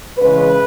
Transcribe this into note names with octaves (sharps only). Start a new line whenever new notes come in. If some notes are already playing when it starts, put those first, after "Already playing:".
C#3 E3 G#3 B4